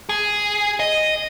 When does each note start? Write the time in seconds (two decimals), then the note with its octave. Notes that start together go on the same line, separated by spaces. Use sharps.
0.09 G#4
0.80 D#5